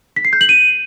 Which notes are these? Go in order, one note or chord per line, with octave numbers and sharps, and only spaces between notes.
B6
C7
G6
F#7
D#7